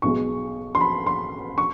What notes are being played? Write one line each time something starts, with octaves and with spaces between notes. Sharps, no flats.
B1 B2 G#3 C#6
C6
B5
C6
C#6